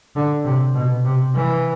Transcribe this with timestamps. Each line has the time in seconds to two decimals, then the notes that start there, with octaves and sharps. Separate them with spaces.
0.15 D3
0.45 C3
0.75 B2
1.04 C3
1.35 E3